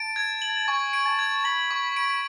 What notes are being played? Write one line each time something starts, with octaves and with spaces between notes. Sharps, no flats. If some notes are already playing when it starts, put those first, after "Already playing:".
Already playing: A5 D7
G#6
F#7
G#5 C#6
D7
A5
G#6
B5 F#7
C#6
D7